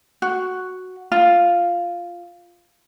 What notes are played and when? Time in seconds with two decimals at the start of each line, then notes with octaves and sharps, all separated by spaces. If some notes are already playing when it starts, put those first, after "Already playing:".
0.22 F#4
1.12 F4